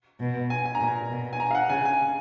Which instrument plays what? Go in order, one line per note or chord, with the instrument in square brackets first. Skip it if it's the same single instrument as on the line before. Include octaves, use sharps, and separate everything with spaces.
[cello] B2
[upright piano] G#5
G#5
A#5
[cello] A#2 [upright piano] G#5
[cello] B2
[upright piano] G#5
A#5
F5
F#5
[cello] C#3 [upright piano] G#5
[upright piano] G#5